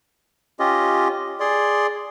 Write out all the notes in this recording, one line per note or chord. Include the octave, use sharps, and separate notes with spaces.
C#4 F4 G4 D#5
G#4 D5 C6